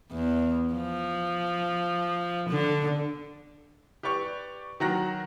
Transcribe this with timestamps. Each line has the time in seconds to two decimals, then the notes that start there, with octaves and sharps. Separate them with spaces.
0.12 E2
0.74 F3
2.50 D3
4.03 G4 B4 D5 C#6
4.80 D#3 F#3 F#4 A#5 F#6 A#6